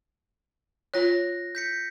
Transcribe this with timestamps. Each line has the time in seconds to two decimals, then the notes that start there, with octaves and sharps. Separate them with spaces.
0.94 F4 C#5 F#6 A#6
1.55 G6 B6 C#7